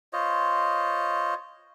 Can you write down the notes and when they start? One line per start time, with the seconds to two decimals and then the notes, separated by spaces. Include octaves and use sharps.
0.13 F4 C5 C#5 D#5